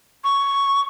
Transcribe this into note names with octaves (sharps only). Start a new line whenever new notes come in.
C#6